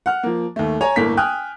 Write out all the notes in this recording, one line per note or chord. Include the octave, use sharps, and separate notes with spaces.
F#5 F6
F3 A#3
D#2 A3
C#5 G#5 A#5
G1 A2 A#3 B6
G5 G#5 D#6 F6 F#6